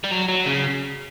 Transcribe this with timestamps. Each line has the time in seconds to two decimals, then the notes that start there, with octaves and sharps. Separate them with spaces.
0.04 G3
0.11 F#3
0.28 F#3
0.46 C#3